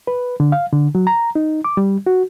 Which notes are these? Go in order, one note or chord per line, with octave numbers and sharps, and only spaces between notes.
B4
D3
F5
D3
F#3
A#5
D#4
D6
G3
F#4